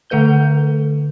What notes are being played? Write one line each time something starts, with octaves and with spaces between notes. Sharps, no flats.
D3 A3 A4 B4 G6 G7